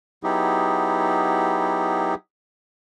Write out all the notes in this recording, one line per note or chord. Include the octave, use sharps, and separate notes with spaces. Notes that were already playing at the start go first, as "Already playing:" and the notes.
F#3 B3 D#4 E4 G4 G#4